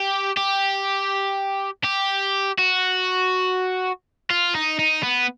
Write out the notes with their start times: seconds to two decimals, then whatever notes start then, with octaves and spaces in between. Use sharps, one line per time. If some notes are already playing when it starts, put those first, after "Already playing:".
Already playing: G4
0.37 G4
1.84 G4
2.58 F#4
4.30 F4
4.55 D#4
4.79 D#4
5.04 B3